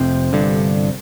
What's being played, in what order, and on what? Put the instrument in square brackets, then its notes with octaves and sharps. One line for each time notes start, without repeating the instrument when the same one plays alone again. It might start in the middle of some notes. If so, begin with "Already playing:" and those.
Already playing: [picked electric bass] F1 F2 C3 C4
G1 G2 D3